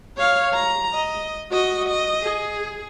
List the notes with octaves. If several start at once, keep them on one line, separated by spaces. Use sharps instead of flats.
C#5 F5
A#5
D#5
F#4 D#5
D#5
G#4